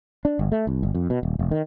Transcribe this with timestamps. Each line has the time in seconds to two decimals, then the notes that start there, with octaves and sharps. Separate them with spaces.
0.25 D4
0.39 G1
0.52 A3
0.67 C2
0.83 G1
0.95 F2
1.10 B2
1.23 D#1
1.39 F1
1.51 D#3